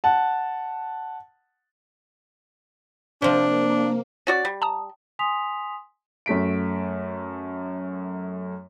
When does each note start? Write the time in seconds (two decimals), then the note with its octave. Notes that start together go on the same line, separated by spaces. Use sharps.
0.04 F#5 A5
3.22 C3 F3 A#3 D4
4.27 C#4 F#4 D5
4.45 G3
4.62 A5 A#5 D#6
5.19 G#5 C6 D#6 B6 F7
6.26 F#2 A3 B6 D7